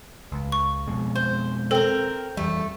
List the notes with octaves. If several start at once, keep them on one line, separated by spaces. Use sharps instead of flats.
C#2
C#6
F2 B2 G#3
C5
C4 A4 A#4
F2 E3 G3 A3